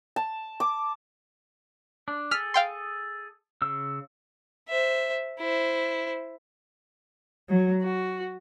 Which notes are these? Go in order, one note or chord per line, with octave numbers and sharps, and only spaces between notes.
A5
D6
D4
G#4 A4 F6 B6
F5 G5 C6
C#3 E6
C5 E5
E4 C5
F#3
F#4